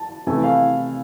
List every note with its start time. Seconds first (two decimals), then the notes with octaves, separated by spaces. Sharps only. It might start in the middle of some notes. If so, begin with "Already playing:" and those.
Already playing: A5
0.27 C3 E3 A3 G#5
0.44 F5